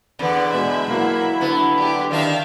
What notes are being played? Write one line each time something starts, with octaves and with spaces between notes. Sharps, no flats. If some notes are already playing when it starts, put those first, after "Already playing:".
E2 D3 B3 D5
B2 G#3 E5 B5
F#3 A#3 E4
D3 B3
D4 G4
D#3 D4 E5 F5 G5